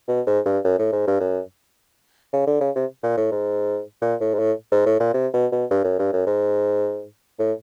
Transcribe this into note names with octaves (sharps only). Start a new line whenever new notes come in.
B2
G#2
G2
F#2
A2
G#2
G2
F#2
C#3
D3
C#3
C3
A#2
A2
G#2
A#2
A2
G#2
A2
G#2
A2
A#2
C3
B2
B2
G2
F#2
G2
F#2
G#2
A2